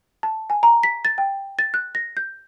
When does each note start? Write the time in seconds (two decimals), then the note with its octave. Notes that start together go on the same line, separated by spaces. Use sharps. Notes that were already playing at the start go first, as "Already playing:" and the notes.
0.23 A5
0.50 G#5
0.63 A#5
0.83 B6
1.05 A6
1.18 G5
1.59 A6
1.74 F#6
1.95 A#6
2.17 G6